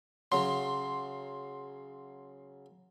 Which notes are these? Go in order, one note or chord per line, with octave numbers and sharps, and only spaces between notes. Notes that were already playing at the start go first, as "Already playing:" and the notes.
C#3 F#3 C6